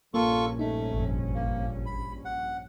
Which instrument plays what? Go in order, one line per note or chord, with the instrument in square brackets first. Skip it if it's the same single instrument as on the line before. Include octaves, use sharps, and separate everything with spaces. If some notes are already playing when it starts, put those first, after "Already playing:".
[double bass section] A#1 G2 C#4 [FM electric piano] A#3 A#4 [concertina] F4 A4 C#6
[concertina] A3 [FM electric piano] D#4
[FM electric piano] G#1 F2
[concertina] A#3
B5
F#5